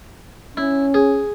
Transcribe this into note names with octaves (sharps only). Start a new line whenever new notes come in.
C#4 E4
G#4